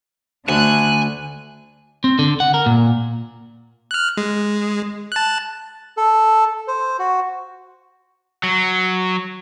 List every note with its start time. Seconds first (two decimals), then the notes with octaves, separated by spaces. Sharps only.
0.49 D2 D3 G#5 F#6
2.04 C4
2.19 D3
2.40 F#5
2.54 A#4
2.66 A#2
3.91 F6 F#6
4.17 G#3
5.12 A5 F#6
5.97 A4
6.68 C5
6.99 F#4
8.44 F#3